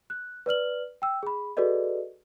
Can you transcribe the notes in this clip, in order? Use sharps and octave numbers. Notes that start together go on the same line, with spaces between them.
F#6
B4 D5 F6 F#7
G5 E6
G#4 B5
F#4 G#4 A4 B4 D5 D#5